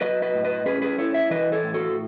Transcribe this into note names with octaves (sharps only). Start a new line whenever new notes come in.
F#3 B4 D#5
B4 D#5
A2
B4 D#5
C#4 G#4 B4
G#4 B4
E4 A4 C#5
C#5 E5
E3 B4 D#5
A4 C#5
A2
F#4 A4